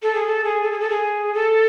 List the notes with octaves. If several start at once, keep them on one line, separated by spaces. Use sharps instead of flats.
A4
G#4
A4
G#4
A4
G#4
A4
G#4
A4